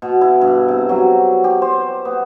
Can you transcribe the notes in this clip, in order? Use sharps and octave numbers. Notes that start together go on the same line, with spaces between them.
B2
E4
G2
C3
F#3
G4
C5
B3